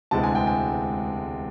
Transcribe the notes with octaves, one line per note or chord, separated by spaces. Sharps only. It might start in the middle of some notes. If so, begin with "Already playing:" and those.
E1 D2 C3 E3 G#3 A5
G#5
G5
G#5